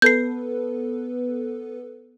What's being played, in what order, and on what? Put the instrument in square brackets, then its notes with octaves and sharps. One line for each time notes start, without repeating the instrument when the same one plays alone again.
[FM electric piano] B3 A4 B4 [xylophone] G6 C7